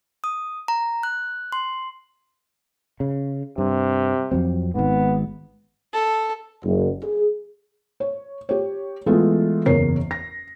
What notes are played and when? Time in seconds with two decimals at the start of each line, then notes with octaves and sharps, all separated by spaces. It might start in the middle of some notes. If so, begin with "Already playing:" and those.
0.24 D#6
0.68 A#5
1.03 F#6
1.52 C6
3.00 C#3
3.58 G2 C3
4.31 F2 F#3 C4
4.75 G#1 G#2 B3
5.94 A4
6.64 F#1
7.03 G#4
8.00 C#5
8.49 G4 C#5
9.06 E3 G#3 A3 B3 F4
9.66 F#1 E2 A#4 C#5 C7
10.11 A#6